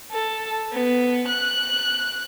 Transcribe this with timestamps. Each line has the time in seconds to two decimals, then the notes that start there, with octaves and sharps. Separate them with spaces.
0.12 A4
0.73 B3
1.29 F#6